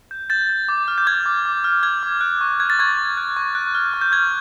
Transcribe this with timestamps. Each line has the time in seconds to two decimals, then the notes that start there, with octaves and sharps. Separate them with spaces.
0.11 G6
0.30 G6 A6
0.49 G6
0.69 D6
0.88 F6
0.98 G6
1.07 D6 G#6
1.26 D6
1.45 D6
1.64 F6
1.83 F6 G#6
2.03 D6
2.21 F#6
2.41 C#6
2.60 F#6 G#6
2.70 A6
2.79 C#6 G#6
2.98 C#6
3.17 F#6
3.36 C#6
3.55 F#6
3.75 F6
3.94 C#6
4.01 G6
4.12 F6 G#6